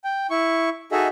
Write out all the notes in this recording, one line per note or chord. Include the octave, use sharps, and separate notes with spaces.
G5
E4 C#6
D#4 F#4 G#4 A4 D#5 E5